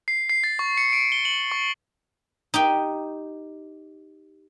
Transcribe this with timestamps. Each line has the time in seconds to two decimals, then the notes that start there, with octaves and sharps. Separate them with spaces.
0.08 C7
0.30 C7
0.44 A6
0.59 C#6
0.78 C#7
0.93 D7
1.12 G7
1.25 F#7
1.52 C#6
2.54 D#4 G4 G5